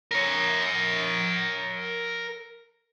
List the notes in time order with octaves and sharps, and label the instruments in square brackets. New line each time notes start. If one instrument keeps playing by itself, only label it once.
[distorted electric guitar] A#4 C#5